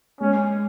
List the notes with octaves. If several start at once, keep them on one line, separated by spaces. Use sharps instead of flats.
G#3 C#4